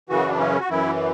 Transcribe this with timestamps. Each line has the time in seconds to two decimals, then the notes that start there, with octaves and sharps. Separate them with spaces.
0.09 F#2 C#3 E3 F#4
0.28 D4
0.39 C#4
0.60 F#4
0.69 F#2 E3 E4